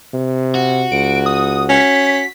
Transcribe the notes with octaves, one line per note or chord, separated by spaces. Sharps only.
C3
F#4
C#2 D7
D#6
C#4 B6